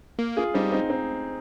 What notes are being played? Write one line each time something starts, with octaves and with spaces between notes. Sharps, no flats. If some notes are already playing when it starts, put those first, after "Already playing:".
A#3
F4 G#4
G3 C4 D#4
C4 D#4
C4 D#4